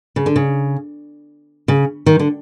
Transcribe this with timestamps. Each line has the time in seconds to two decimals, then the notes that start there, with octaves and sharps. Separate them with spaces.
0.16 C#3
0.26 D3
0.36 C#3
1.68 C#3
2.06 D#3
2.19 D3